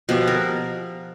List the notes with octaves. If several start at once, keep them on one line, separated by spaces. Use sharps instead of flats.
B2 F3 G4
A#4